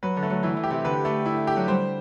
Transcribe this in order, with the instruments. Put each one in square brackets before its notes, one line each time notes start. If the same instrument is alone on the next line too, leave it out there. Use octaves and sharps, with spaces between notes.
[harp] F#3 [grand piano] B4
[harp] D3
[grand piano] A3
[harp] F#3
[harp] E3 [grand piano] E4
[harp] E3
[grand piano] G4
[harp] C3
[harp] D3 [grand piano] B4
[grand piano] A3
E4
G4
[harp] F#3
[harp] G3 [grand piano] C5